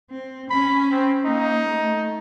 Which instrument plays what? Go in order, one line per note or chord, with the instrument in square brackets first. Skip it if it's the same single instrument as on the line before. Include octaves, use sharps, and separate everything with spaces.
[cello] C4
[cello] C#4 [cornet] B5
[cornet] C4
[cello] A#3 [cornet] D#4
[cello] A3